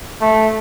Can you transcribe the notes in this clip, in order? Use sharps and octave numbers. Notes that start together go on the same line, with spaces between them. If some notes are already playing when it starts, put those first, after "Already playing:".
A3